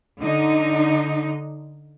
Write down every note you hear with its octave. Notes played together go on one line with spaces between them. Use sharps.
D3 D#4